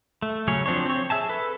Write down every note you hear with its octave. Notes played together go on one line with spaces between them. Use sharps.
A3
C#3 F#3 C#4 C#5
F3 C4 D4 C#5
C4 C#5
G#4 E5 G#5 A5
A4 B4